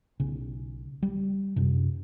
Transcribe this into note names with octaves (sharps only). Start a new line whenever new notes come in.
B1 C#3
G3
F#2 C3